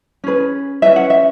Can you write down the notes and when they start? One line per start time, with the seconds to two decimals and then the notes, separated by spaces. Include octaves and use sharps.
0.24 C#4 G#4 B4
0.82 C#4 F#4 B4 E5
0.96 F#5
1.10 E5